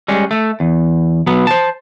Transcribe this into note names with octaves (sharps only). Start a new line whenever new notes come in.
G3 G#3 C#4
A3
E2
B2 F#3 B3
C5 A5